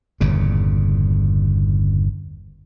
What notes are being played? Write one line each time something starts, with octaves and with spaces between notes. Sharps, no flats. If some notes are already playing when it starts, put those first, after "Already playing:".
G1 E2 A#2 C#3